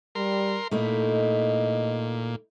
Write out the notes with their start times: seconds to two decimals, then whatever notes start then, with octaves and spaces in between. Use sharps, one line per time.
0.15 G3 A#4 C6
0.71 A#2 A3 D#4 E4 D#5